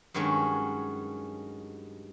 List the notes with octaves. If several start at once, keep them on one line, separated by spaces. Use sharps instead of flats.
G2 D#3 F#3 G#3 C#4